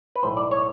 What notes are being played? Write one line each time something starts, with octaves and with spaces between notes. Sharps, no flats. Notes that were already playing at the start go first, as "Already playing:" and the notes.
B4
B1 A2 E3 G#3 C5
D5
C#5